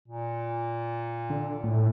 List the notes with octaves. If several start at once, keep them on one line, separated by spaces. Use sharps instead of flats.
A#2
D3
A2